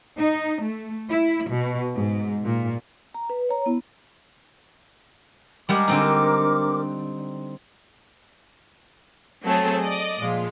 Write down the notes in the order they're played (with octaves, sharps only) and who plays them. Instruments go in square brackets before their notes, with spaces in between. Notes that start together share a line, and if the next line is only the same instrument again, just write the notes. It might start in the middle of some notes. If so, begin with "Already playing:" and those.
[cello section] D#4
A3
E4
B2
G#2
A#2
[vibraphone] A#5
B4
C#5 A#5
B3 E4
[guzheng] G3 G#3 F#5 [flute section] A#4 D6
[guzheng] D3 C4 D#4
[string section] F#3 A3 C4 G#4 A4 C#5
D5 D#5
A#2 F3 G#3 F4